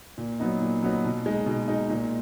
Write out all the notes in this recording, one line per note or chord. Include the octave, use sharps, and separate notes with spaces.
A#2
F#3 B3 D#4
A#2
F#3 B3 D#4
B2
G#3 D#4
B2
G#3 D#4
A#2